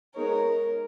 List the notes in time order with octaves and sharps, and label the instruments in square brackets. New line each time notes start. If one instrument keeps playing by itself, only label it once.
[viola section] G#3 B3 D#4 G#4 C#5 [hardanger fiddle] A#4